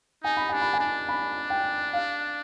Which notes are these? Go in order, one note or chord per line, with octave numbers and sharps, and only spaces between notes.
D#4 G#5
B5
D4 G#5
B5
G#5
D4
B5
G5
F5